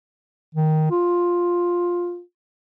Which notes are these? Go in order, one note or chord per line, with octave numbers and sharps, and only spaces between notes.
D#3
F4